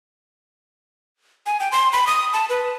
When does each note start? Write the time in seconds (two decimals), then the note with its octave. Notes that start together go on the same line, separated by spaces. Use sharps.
1.46 G#5
1.60 G5
1.72 C6
1.93 B5
2.07 D#6
2.33 A5
2.49 B4